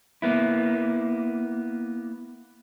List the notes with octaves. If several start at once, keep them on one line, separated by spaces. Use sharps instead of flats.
A#3 B3 E4